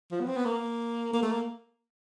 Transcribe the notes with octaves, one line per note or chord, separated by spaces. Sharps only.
F3
B3
C4
B3
A#3
A#3
A3
A#3